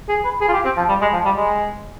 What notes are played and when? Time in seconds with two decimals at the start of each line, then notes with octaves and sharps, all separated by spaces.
0.09 G#4
0.25 B4
0.41 G#4
0.48 F4
0.53 G4
0.65 C4
0.77 F3
0.89 G3
1.01 G#3
1.13 F3
1.25 G3
1.37 G#3